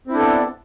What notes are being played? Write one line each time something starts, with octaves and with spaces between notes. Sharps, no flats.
B3 C4 D4 E4 A4